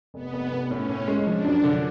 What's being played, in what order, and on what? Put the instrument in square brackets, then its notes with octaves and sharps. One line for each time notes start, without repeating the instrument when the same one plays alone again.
[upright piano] F1 [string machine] B3
[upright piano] F1
F1
[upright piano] A2 [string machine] C#4
[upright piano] A2
G#3
[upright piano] F3 [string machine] D4
[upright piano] F#2
D3